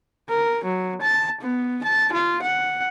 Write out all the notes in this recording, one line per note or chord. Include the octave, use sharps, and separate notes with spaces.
A#4
F#3
A5
B3
A5
F4
F#5